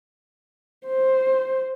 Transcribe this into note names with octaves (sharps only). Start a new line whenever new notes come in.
C5